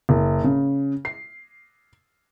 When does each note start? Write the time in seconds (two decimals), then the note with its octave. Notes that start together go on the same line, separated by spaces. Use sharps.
0.09 F#1
0.44 C#3
1.05 C7